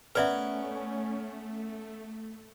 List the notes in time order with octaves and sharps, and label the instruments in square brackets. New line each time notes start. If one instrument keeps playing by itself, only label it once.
[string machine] A3 [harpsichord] B3 A#4 [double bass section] C#4 [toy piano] B4 D5 E5